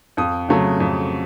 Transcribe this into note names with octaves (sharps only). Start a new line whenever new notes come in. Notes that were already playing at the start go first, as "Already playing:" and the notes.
F2 D#6
C#3 F#3 A3
F2